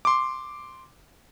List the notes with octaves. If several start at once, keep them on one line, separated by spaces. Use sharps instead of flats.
C6 D6